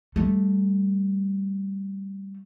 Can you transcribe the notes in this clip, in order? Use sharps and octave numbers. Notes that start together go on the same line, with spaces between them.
G3 A3